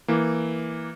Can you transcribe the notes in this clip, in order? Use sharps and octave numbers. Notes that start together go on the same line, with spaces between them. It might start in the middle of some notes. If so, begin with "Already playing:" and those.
E3 A#3